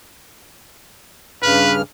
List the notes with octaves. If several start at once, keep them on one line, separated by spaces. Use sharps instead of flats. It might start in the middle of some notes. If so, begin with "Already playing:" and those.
G2 C#3 B4 F6